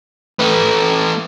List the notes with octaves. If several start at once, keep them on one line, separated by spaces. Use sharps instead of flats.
A3 B4